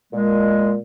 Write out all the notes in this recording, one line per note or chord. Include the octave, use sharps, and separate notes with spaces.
A#2 G#3